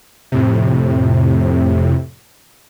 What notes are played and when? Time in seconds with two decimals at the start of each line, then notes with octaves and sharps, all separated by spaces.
0.32 F2 A2 C3